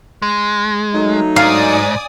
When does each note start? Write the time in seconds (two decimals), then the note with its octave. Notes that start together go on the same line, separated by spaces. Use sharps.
0.22 G#3
0.94 F#3 A3 D#4
1.36 G#2 D5 F5 G#5 D#6